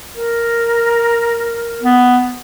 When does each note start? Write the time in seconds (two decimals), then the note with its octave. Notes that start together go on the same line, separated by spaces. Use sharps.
0.15 A#4
1.82 B3